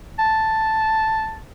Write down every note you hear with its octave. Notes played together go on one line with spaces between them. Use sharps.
A5